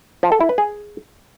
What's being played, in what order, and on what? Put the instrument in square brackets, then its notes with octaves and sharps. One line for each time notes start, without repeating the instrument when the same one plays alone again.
[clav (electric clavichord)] F3
A4
E4
B4
G#4